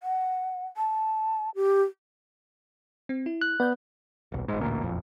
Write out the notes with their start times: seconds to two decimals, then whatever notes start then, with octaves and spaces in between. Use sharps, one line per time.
0.03 F#5
0.77 A5
1.55 G4
3.09 C4
3.26 E4
3.41 F#6
3.60 B3 D5 G6
4.32 D#1 B1
4.48 G1 G#2
4.60 A1 D2 A#2
4.82 E1 A#1 F2